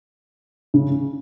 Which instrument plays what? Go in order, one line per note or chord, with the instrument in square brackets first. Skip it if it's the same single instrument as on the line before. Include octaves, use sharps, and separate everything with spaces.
[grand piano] C#3